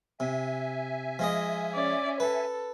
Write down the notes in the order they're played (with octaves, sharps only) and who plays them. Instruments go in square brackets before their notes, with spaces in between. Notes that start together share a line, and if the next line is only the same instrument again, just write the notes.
[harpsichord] C3 [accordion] E5 G#5
[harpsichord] F3 G#3 D#5
[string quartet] C#4 D5
[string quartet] A4 [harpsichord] B4